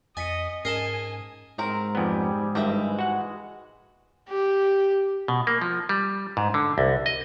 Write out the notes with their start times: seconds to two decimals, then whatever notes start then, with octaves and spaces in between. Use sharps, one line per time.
0.17 F2 D#5 G#5 A6 B6 C#7
0.65 G#2 C#4 G#4 A#4 D#5 G#5 A5 C7
1.58 G#2 F#3 C4 A#4
1.95 F2 G3 B3 G4 G#4
2.55 G#1 G2 E3 G3 G#3 D#5 E5
2.99 F#4 F#5
4.29 G4
5.28 B2
5.47 A#3
5.61 F3
5.89 G3
6.37 G#2
6.54 D3
6.78 C2
7.06 D#5